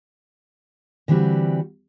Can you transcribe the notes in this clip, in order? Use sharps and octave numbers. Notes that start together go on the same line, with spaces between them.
D3 E3 G3 C4 F#4